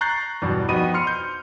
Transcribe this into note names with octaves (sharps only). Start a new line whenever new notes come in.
A#5 C#6 F#6 G6 A6 C7
E2 G2 B2
F2 B3 D#4 F#4 B5 D#7
C6 F6 C#7
G6